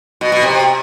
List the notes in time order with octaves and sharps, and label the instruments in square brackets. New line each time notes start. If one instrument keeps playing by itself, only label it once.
[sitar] B2
B2
C3